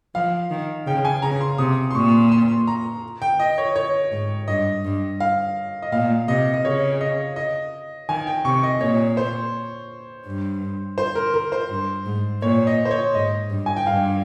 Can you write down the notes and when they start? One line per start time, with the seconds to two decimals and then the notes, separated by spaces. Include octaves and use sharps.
0.15 F3 F5
0.50 D#3
0.87 C#3 G5
1.05 G#5
1.22 C#3 A#5
1.41 C6
1.58 C3 D#6
1.91 C6
1.95 A#2 C#6
2.32 C6
2.67 A#5
3.22 G5
3.40 D#5
3.58 C#5
3.76 C#5
4.12 G#2
4.48 G2 D#5
4.84 G2
5.20 F5
5.82 D#5
5.92 A#2 F5
6.28 C3 D#5
6.54 D#5
6.64 C#3 C#5
7.01 D#5
7.36 D#5
8.09 D#3 G#5
8.27 G5
8.45 C3 C#6
8.63 D#5
8.81 A#2 C#5
9.17 C5
10.26 G2
10.98 C5
11.15 A#4
11.34 A#4
11.52 C5
11.69 G2
12.06 G#2
12.42 A#2 C#5
12.67 D#5
12.85 C5
12.91 C#5
13.14 G#2 D#5
13.50 G2
13.66 G#5
13.76 G5
13.86 G2 F5